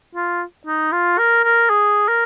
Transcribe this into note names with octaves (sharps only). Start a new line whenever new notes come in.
F4
D#4
F4
A#4
A#4
G#4
A#4